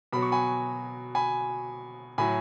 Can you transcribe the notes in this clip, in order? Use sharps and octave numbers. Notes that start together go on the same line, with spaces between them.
B2 F#3 B5
C#6
G#5 B5
G#5 B5
A2 F#3 G#5 B5